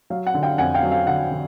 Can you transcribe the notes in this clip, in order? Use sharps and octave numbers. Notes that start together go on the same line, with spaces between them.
F#3 F5
F#5
D3
F5 G5
F2 F#5 G#5
F5 G5
F#3
F5
D3 F#5
D3